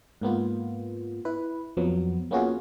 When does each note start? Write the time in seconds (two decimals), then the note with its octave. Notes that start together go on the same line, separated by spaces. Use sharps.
0.21 G#2 A#3 B3 F4
1.25 E4 B4
1.77 F2 F3 F#3 B3
2.31 A#3 B3 C#4 F4 F#4 G#4